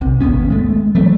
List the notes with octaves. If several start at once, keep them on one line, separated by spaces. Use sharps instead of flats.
B1 C3
G#1 D#2 B3 C#4
G#3 A3
E3 F#3 A3 C4